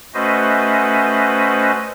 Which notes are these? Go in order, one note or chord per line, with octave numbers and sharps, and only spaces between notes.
A3 C#4 F#4 B4 C5 D#5